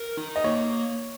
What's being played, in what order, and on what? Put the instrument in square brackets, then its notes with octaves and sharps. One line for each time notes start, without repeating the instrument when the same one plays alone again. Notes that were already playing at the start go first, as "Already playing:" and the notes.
Already playing: [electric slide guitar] A#4
D#4
[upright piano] D#5
[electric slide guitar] A#3 [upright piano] C#5